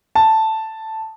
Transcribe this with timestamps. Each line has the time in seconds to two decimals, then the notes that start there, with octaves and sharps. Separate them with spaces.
0.15 A5